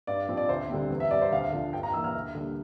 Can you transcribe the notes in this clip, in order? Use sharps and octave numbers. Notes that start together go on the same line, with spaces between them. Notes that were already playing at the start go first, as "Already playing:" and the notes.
G2 D5
F3 C4
D5
D2 C5
D3 G3 C4
E2
E5
C3 G3 D5
C5
D2 F5
D3 F3
G2 G5
A#5
E3 A#3 E6
F6
D2
D3 G3 A#3